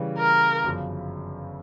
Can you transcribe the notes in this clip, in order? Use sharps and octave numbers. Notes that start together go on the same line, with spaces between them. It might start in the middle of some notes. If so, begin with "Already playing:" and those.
Already playing: C#3 E3 G3
A#4
G1 F#2 C#3 F3